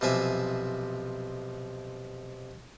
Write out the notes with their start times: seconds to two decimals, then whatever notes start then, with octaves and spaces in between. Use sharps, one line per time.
0.01 B1 C3 F3 D5 E5 G#5